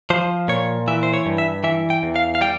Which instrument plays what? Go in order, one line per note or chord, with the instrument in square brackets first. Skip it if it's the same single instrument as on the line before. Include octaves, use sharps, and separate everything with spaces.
[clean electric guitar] F3 C5
A#2 C#5
E3 E5
C5
C#5
G2
E5
E3 E5
G5
E2
F5
F5
G3 G5